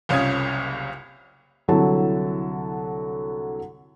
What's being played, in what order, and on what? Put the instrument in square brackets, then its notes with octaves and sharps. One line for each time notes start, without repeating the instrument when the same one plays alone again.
[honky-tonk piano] F#1 C2 C#4 F4 D#6 G#6
[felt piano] C2 D3 F#3 E4 A5